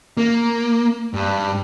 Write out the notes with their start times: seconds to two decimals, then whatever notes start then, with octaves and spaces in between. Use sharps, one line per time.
0.17 A#3
1.14 G2